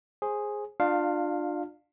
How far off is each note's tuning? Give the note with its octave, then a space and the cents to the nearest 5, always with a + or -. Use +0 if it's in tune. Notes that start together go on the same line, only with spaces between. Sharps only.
G#4 +0 C5 +20
D4 +30 F4 +20 F5 +0